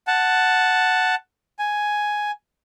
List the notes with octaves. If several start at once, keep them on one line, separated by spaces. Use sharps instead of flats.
F#5 A5
G#5